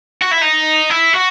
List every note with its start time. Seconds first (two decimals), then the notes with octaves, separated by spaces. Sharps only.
0.22 F#4
0.32 E4
0.42 D#4
0.91 E4
1.14 F#4